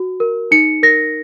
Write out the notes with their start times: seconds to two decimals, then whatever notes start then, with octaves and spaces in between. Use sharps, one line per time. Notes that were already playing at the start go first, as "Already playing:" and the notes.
Already playing: F#4
0.20 A#4
0.51 D#4 C#7
0.83 A#4 A#6